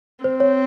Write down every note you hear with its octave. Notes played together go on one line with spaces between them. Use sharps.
C4 C5
C#5